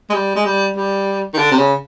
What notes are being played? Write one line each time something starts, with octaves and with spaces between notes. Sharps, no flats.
G#3
G3
G#3
G3
G3
D#3
D3
C3
C#3